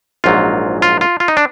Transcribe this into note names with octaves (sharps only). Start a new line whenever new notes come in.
A#1 G#2 F#3 F4
F4
F4
F4
D#4
D4